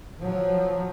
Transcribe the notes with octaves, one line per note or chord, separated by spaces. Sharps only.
F3 F#3